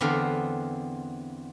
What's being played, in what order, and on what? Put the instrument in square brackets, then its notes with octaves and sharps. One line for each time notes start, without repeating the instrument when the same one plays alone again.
[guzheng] E2 D3 B3 C4 D5 F5